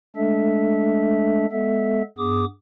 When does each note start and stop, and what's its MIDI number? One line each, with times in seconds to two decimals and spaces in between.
0.16 1.46 56
0.16 1.46 57
0.16 1.46 62
0.16 1.46 69
0.16 1.46 76
1.52 2.02 56
1.52 2.02 59
1.52 2.02 69
1.52 2.02 76
2.18 2.45 43
2.18 2.45 59
2.18 2.45 68
2.18 2.45 86
2.18 2.45 87